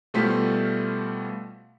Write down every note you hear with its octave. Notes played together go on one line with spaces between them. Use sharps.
B2 G3 A3 F4 C5 B6